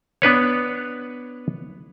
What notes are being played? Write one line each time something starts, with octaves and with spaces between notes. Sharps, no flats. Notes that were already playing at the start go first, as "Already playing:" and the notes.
B3 D4 B4 C#5